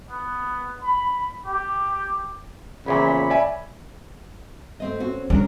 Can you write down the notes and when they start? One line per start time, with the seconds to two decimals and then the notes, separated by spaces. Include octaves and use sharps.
0.10 B3
0.83 B5
1.46 G4
2.86 A#1 E2 A#2 C#3 C#5 B5
3.30 D5 E5 G#5
4.80 A3 C4 D#5
5.00 C4 C#4 F#4
5.30 G3 C#4 D4 A#4